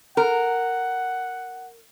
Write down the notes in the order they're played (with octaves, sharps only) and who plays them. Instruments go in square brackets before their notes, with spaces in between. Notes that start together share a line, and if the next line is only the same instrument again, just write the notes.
[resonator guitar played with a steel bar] A#4 [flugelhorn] F#5